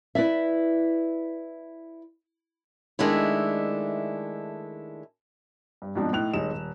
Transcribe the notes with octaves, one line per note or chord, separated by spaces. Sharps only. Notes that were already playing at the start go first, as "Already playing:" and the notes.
E4 B4 D5 E5
D#3 G#3 A3 D4 E4
G2
G#2 B2 F3 C4 D4
A2 D#4 F#6 F7
D#1 G#3 D#4 E7
D#1